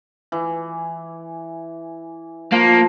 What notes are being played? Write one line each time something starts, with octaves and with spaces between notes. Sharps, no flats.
E3
F3 A#3